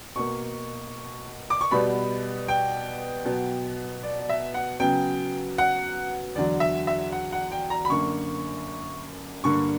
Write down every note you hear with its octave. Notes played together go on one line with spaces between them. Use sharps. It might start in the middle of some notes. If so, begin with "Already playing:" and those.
B2 A#3 C#6
D6
C#6
B2 G3 B3 B5
G5
B2 F#3 B3
D5
D5
E5
F#5
C#3 F#3 B3 G5
F#5
E2 D3 F#3 D5
E5
E5
F#5
F#5
G5
A#5
B5
F#2 D3 A#3 C#6
G2 D3 A#3 C#6